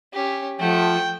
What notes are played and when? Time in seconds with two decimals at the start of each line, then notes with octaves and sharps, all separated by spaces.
0.13 C#4 G4
0.59 F3 A3 F#5 G5